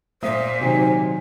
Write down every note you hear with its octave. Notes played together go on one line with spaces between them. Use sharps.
A#2 A#3 C5 E5 D#6
C3 D#3 F#3 G#5